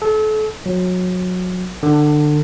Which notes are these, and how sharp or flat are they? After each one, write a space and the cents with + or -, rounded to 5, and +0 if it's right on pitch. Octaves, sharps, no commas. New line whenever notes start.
A4 -35
F#3 -25
D3 +25